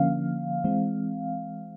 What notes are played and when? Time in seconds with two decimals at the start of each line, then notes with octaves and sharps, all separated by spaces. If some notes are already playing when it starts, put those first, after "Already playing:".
Already playing: D3 F3 A#3 C#4 F5
0.64 E3 G#3 C4